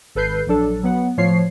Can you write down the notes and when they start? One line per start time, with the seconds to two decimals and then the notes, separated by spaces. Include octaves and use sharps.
0.15 G#1 A4 B4 G6 C7
0.46 A#1 F#3 D4 A4
0.83 F#3 B3 F#5
1.17 A2 F3 C#5 C7